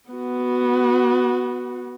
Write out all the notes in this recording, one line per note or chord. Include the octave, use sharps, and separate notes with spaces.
B3 F#4